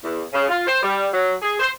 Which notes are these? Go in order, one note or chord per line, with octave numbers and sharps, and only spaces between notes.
E2
C#3
F4
C5
G3
F#3
G#4
C5